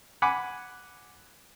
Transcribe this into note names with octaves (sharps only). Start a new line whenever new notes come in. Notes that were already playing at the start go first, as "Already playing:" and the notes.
F#5 G#5 B5 D6